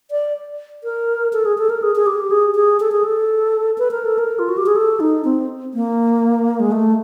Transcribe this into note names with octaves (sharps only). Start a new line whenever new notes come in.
D5
A#4
A4
G#4
A4
A#4
G#4
G#4
G4
G#4
G#4
A4
G#4
A4
B4
A#4
A4
A#4
F4
F#4
G4
G#4
A4
D#4
C4
A#3
G#3
A3